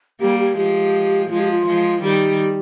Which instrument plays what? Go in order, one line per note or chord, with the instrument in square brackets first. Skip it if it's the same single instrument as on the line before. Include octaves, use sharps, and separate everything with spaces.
[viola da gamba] G3 A#3 [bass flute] G4
[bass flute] G4
[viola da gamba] F3 G#3 [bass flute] G4
[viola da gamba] F3 G#3 [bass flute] F4
[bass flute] G4
F4
[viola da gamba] F3 G#3
[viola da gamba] D#3 G3 [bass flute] G4